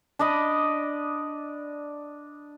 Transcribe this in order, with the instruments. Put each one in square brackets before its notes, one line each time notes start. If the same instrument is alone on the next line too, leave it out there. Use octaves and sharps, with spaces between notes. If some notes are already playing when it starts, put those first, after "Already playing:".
[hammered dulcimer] D4 D5 D#5 B5